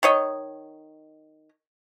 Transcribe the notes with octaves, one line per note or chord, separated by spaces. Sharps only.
D#3 C#5 D#5